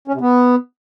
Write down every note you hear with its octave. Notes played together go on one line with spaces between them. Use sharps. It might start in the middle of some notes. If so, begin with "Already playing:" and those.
C#4
C3
B3